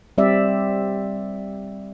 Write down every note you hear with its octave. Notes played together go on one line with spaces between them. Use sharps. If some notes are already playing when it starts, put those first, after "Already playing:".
G3 C4 G4 D5 E5